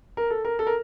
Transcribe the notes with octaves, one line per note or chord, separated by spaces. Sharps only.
A#4
A4
A#4
A4
A#4